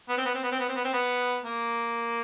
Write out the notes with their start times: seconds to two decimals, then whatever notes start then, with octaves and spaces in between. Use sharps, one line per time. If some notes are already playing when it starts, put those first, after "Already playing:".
0.09 B3
0.17 C4
0.26 B3
0.35 C4
0.43 B3
0.52 C4
0.60 B3
0.69 C4
0.76 B3
0.85 C4
0.93 B3
1.44 A#3